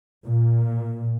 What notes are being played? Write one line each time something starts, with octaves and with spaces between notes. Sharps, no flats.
A#2